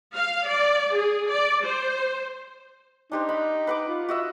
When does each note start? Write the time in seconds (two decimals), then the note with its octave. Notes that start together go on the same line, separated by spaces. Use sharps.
0.13 F5
0.46 D5
0.93 G#4
1.29 D5
1.63 C5
3.12 D4 D#4 G4 C5
3.29 D#5 B5
3.67 B4 F#5 D6
3.88 F4
4.09 F#4 D#5 E5